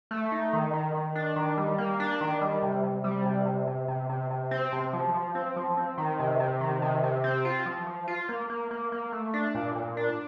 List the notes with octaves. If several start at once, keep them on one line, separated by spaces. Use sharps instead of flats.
A3
D#4
D#3
D#3
D#3
D4
D#3
G3
A#3
D4
D#3
G3
C3
C3
G3
C3
C3
C3
C3
C3
C3
C4
C3
F3
F3
C4
F3
C4
D#3
C3
C3
D#3
C3
C3
C4
F4
F3
F3
F4
A#3
A#3
A#3
A#3
A3
D4
A#2
A#2
D4